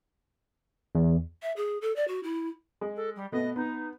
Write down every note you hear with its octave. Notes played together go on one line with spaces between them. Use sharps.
E2
E5
G#4
A4
D5
F#4
E4
G#3
A4
G3
B2 A3 B3 D#5
B3 D#4